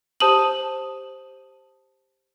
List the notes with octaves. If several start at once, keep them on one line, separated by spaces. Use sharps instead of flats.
G4 C5 A5 D#6 D#7 F#7